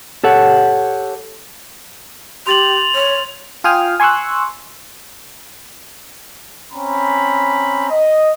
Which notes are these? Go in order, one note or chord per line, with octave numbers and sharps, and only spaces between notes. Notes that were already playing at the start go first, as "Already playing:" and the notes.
G4 A4 C#5 F#5
G4 C6 A6 F7 F#7
C#5
F4 F5 G5 G#5 D#6 F6
G#5 C6 C#6 E6 F#6
C4 C#4 A#5 B5
D#5